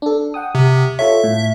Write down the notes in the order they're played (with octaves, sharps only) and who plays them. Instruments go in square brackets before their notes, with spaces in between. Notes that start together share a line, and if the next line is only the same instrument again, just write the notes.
[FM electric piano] D4 A4
F#5 G5 D#6
[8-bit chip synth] C3
[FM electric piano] F4 A4 C#5 [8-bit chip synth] E5
[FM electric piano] A2